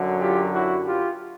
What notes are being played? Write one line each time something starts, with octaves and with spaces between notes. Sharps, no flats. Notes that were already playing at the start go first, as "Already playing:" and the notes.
Already playing: F#2 D3 F#3
F4 G4
E4 F#4
F4 G4